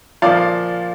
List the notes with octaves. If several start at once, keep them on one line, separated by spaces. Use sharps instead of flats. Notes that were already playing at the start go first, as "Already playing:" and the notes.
A#2 F3 D5 F5